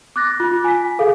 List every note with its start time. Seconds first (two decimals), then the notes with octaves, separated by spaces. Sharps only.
0.16 D6 F#6 A6 A#6
0.40 F4
0.65 G#5 B6
0.99 G#4 A4 F5